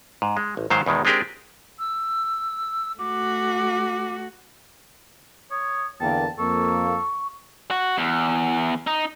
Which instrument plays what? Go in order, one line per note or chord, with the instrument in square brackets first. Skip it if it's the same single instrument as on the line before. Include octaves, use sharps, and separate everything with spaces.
[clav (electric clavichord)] G#2
G#3
A1
G#2 D#3 F#3 C5 F5 A#5
E2 B2 D#3 G#3
G#3 C4 D4 G4 G#4 A#4
[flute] E6
[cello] A3 F#4 [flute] D6
[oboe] C#5 [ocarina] D#6
[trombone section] E2 D3 A#3 [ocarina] G5 [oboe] A5
[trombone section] F2 A#3 [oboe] A4 [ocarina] C#6
[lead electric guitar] F#4
E2
D#4